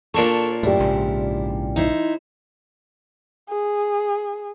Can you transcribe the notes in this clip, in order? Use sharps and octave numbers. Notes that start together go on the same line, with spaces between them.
A#2 D4 A4 C#5 C#6
F#2 A2 E4 G4 D5
A#1 G#2 C#3
D#4 E4 C5
G#4